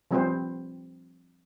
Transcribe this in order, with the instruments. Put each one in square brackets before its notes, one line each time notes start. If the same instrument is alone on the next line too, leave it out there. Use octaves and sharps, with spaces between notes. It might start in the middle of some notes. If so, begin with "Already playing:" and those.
[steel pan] F3 G3 C4 G4 B4 C5